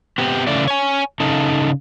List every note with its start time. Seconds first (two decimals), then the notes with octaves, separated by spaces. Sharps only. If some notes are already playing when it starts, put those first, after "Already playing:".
0.18 B3 C4 G4
0.47 C#3 E3 A3 D5
0.67 C#5 G#5
1.20 C#3 D#4 A4